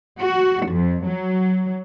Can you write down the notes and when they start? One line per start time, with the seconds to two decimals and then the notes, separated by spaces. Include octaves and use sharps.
0.20 F#4
0.68 F2
1.04 F#3